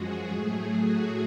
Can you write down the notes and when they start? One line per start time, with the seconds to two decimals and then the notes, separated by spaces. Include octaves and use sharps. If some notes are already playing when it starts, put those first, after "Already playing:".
Already playing: F#2 F3 G#3 F#4 G#4
0.30 A2 F#3 A3 G#4
0.74 F#4